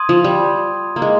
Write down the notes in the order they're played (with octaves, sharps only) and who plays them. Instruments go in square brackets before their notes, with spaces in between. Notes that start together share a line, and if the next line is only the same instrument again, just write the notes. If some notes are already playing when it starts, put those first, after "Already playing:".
Already playing: [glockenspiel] C6 D#6 G#6 D#7
[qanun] F3
G3
A#3
G#3